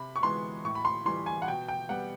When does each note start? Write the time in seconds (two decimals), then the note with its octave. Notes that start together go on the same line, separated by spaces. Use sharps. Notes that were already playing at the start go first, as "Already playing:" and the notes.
Already playing: C3 B5
0.16 C#6
0.23 E3 G#3 B3 C6
0.65 A2 C#6
0.75 B5
0.85 C6
1.05 E3 G3 C6
1.26 G#5
1.42 F#5
1.48 B2 G5
1.68 G5
1.89 G3 B3 F#5